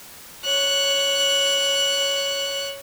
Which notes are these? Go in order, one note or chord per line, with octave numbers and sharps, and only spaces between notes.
C#5 F#6